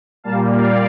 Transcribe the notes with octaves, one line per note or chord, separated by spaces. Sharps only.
A#2 G3 A#3 F5 A5
D5 F5